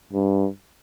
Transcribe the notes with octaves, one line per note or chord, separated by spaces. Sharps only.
G2